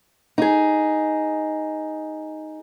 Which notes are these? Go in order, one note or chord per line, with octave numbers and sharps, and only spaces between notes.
D#4 G#4